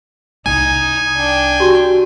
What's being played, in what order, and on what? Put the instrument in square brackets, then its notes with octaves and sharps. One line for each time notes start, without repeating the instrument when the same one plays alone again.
[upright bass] C2 C#4 [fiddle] D#4 [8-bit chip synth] G#5
[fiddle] D4 G5
[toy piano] F#4 G4